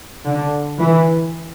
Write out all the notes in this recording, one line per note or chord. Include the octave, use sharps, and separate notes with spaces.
D3
E3